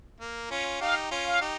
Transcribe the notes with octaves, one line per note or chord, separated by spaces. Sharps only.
A#3
C#4 F4
D#4 G4 F5
C#4 F4
F5
D#4 G4